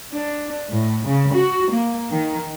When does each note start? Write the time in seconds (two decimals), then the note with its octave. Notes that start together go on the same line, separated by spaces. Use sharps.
0.14 D4
0.71 A2
1.08 C#3
1.36 F#4
1.72 A#3
2.12 D#3